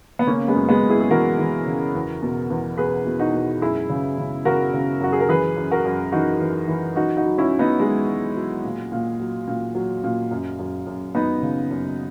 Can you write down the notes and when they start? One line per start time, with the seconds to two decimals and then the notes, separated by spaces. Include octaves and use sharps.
0.19 B3
0.27 C#3 A#3 C#4
0.48 G#3 B3
0.55 F#2
0.69 G#3 B3
0.83 F#2
0.89 E4 G#4
1.00 G#4
1.11 E3 F#4 A#4
1.39 E3
1.67 C#3
1.95 E2
2.22 B2
2.50 E2
2.77 B2 G#4 B4
3.05 B2
3.19 D#4 F#4
3.34 B2
3.61 F#2 E4 G#4
3.89 C#3
4.18 C#3
4.45 C#3 F#4 A#4
4.73 C#3
5.01 F#2 F#4
5.12 G#4
5.20 A#4
5.29 E3 G#4 B4
5.57 F#2
5.71 F#4 A#4
5.85 F#2
6.12 E3 D#4 F#4
6.41 E3
6.68 E3
6.96 F#3 D#4 F#4
7.17 D#4 F#4
7.24 F#3
7.38 C#4 E4
7.52 F#3
7.59 B3 D#4
7.80 F#3 G#3
8.08 F#3
8.36 F#3
8.64 A#2
8.92 A#2
9.19 F#3
9.48 A#2
9.75 F#3
10.04 A#2
10.31 F#2
10.59 F#2
10.87 F#2
11.15 F#2 B3 D#4
11.42 C#3
11.71 F#2